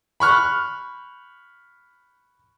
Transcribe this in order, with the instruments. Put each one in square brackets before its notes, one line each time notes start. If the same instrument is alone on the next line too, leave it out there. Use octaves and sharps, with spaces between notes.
[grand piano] B5 C#6 F6 F#6